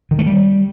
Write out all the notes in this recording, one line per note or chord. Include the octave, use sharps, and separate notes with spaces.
D#3
A3
G3